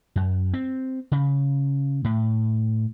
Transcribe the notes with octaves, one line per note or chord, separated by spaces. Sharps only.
F#2
C4
C#3
A2